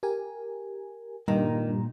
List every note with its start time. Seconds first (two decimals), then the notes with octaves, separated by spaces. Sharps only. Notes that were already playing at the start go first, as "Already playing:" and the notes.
0.03 G4 A#4 G#5
1.28 G2 A#2 D#3 A#5